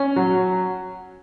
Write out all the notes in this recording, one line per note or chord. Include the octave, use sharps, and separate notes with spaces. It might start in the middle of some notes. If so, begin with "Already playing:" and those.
Already playing: C#4
F#3